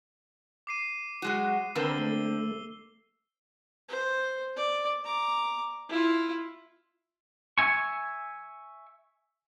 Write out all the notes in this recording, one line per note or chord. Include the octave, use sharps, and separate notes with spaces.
D6 C7 D#7
F#3 G#3 F#4
D3 A#3 C4 A#4 B4 E6 G7
A3 G7
C5
D5
A#5 D6
E4 F4
E5 G#5 C#6